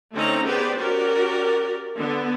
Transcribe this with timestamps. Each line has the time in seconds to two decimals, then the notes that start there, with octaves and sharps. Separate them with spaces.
0.14 D3 A3 C4 C#4 D#4 A#5
0.45 B3 G4 G#4 B4 C5 D5
0.79 C#4 F#4 G4 A#4 D5
1.98 D3 B3